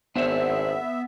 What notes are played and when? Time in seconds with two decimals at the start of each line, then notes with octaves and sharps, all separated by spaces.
0.16 G#1 B3 D4 C5 C#5 E5